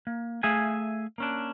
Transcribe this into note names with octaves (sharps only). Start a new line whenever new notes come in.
A#3
A3 G#4 E5 F5 G#5
A#3 C#4 D4